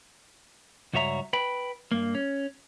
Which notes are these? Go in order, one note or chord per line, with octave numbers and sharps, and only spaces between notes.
C#2 G2 F#4 C#5 E5 A#5
B4 G5 B5
G2 A#3
C#4